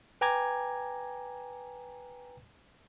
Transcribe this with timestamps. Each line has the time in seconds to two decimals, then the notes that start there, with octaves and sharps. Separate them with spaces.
0.21 B4 G5 G#5 A#5 D6 G#6